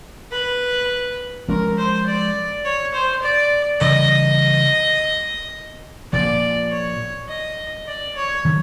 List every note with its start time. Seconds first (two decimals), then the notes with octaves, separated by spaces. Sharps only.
0.32 B4
1.48 F3 G#3 C#4 A#4
1.78 C5
2.07 D5
2.65 C#5
2.94 C5
3.23 D5
3.80 C#3 E3 G3 D#5
6.13 A#2 F3 A#3 D5
6.71 C#5
7.28 D#5
7.87 D5
8.16 C#5
8.45 D#3 F#3